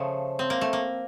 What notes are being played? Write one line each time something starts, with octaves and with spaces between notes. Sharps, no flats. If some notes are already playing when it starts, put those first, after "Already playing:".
Already playing: C#3 F3 A3
C4
A#3
A3
A#3